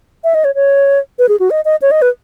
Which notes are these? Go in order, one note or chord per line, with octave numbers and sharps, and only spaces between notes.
E5
D#5
C#5
C#5
B4
G#4
F#4
D#5
D#5
C#5
D#5
B4